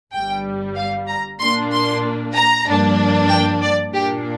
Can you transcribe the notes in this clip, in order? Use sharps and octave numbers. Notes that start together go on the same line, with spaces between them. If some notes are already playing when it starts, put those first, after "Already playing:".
G1 G2 G3 G5
F5
A#5
A#2 A#3 D4 C6
C6
A#5
G2 F3 A#3 D4
G5
D5
A#2 A#3 D4 G4